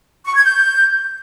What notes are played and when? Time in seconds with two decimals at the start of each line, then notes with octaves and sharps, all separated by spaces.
0.25 C#6
0.35 G#6
0.45 G6